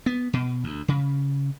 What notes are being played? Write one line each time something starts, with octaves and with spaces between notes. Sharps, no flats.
B3
B2
D2
C#3